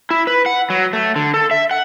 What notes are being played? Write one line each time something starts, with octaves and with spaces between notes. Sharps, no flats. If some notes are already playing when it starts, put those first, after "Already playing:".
E4
B4
F#5
F#3
A3
D3
A4
E5
F#5